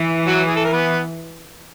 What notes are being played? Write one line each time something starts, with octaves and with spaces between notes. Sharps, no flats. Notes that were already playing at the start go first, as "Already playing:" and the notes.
Already playing: E3
F#3 F#4
G#4
A4
A#4
B3 B4